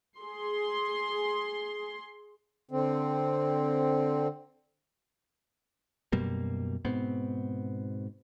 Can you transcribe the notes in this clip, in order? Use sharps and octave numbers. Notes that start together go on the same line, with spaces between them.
G#4 C6
D3 C4
F#2 B2 G3 A#3
G#2 B2 B3 C4